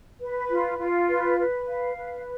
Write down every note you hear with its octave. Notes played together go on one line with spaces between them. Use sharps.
B4
F4
F4
B4
B4
F5
B4